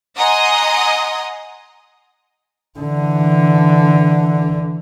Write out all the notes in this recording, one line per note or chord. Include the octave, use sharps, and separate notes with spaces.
D#5 F#5 G#5 A#5 C6 D#6
D3 E3